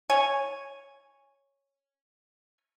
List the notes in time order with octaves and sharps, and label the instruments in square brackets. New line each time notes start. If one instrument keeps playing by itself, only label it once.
[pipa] C#5 G#5